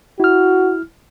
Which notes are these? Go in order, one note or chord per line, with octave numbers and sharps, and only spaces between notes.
E4 F#4 F6